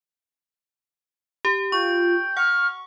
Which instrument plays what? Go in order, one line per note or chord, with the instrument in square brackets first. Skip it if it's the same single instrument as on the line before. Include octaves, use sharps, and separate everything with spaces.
[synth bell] G4
[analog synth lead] F4 [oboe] G5 [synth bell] C#6
[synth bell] F#5 [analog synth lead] C#6 [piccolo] F6